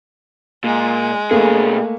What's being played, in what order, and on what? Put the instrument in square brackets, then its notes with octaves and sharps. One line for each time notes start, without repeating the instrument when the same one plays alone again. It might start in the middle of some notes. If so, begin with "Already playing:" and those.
[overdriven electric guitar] A#2 [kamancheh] G#3
[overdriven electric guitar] B2 G#4 [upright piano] A3 A#3